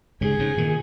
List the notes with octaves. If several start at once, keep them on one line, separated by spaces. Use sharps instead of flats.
G#2 C#3 G#4
G#2 C#3
A#2 D#3